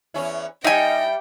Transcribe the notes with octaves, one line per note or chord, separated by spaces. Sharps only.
E2 C#4 E4
G3 D#4 D#5 E5 G5 G#5